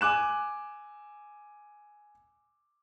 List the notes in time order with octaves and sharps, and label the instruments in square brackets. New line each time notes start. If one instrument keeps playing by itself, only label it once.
[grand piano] G#5 D6 F#6 E7